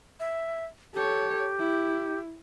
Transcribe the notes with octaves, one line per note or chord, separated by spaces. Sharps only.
E5
G4 A4 C#5
E4